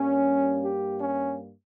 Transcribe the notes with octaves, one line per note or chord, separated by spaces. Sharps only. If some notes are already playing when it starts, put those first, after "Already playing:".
Already playing: G2 G3 A#3 C#4
G4
C#4